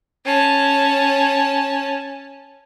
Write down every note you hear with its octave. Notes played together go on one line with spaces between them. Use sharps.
C#4 A5